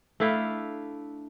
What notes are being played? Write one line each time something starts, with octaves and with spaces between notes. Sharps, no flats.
A3 D4 E4 F5